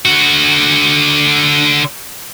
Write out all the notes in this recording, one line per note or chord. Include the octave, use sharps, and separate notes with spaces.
D3 F#4